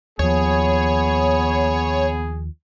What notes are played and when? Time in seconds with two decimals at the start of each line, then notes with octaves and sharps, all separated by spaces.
0.19 D#2 F3 B3 G#4 C#5